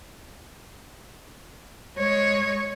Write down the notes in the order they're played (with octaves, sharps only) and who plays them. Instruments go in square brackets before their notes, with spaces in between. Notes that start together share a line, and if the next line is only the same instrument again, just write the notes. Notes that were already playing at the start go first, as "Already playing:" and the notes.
[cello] G#3 C#5